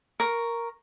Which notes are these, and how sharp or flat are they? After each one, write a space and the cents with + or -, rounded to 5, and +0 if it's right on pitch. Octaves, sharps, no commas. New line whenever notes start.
A#4 +0 C#6 +0